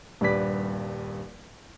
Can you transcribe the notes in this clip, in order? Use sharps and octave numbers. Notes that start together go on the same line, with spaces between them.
D#1 G2 G3 B4 D5 B6